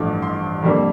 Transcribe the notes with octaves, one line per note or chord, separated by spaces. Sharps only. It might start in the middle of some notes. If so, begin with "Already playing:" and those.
Already playing: A1 G2 F3 A3 D6
C6
F2 D3 G3 A#3